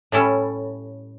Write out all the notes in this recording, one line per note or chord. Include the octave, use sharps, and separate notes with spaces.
A2 G3 C#4 E4 A4